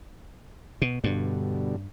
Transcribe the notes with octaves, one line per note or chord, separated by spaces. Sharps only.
B2
G2 B2 D3 G3